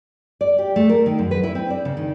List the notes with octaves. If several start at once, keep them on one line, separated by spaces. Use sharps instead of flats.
D5
G4
A3
A#4
D#3
F#2
B4
E4
C4
D5
C#3
D#3